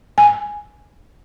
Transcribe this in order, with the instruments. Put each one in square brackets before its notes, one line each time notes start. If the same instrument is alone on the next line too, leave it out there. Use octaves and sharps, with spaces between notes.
[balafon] G#5